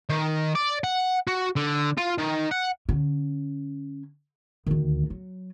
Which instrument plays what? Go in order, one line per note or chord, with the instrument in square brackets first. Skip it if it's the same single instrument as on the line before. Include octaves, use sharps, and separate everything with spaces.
[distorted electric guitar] D#3
D5
F#5
F#4
D3
F4
D#3
F#5
[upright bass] D3 C#4
D2 D#3
F#3